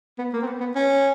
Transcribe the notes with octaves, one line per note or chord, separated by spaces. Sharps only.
B3
A#3
C4
B3
B3
C#4